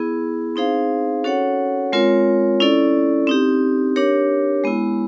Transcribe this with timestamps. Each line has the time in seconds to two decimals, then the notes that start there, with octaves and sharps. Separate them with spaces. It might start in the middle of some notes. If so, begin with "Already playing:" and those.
Already playing: B3 E4 G#4
0.56 C4 D#4 G#4 C5 F5
1.24 C#4 F#4 A4 C#5 F#5
1.92 G#3 C4 F4 A#4 C#5
2.60 C#4 E4 A4 D5
3.27 C4 D#4 G4
3.96 D4 G4 A#4 C#5
4.64 G#3 B3 E4